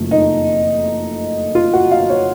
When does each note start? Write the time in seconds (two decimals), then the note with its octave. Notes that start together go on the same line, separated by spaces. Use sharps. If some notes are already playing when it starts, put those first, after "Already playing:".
Already playing: F#1 F2 D#3 F#3 A3
0.11 D#4
1.55 F4
1.73 F#4
1.91 F5
2.10 C#5